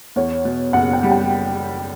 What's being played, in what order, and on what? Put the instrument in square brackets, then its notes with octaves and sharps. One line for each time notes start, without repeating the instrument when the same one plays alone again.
[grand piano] E2 [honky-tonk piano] C#5
[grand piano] B2
[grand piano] F#1 [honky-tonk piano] F#5
[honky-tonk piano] G5
[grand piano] G3
[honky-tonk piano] G5